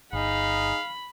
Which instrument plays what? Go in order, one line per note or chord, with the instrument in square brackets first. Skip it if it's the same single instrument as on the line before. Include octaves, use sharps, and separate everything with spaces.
[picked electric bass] G1 [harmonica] D#4 G#4 [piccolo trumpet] F5 [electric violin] B5